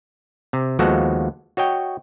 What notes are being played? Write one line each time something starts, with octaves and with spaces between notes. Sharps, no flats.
C3
D#2 F3 G#3 B3 F#4 A4
F#4 C#5 D#5 G5